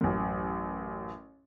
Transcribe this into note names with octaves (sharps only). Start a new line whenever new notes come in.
A1 F#2